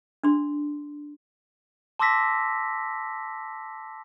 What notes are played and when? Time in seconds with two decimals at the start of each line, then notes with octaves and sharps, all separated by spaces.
0.24 D4 C6
1.99 A5 C6 D6 E6 A#6 B6